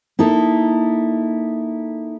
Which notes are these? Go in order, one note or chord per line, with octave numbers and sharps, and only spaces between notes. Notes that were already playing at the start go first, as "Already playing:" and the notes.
A#3 D#4 E4 A4